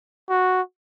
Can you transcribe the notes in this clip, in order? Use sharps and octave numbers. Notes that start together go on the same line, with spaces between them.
F#4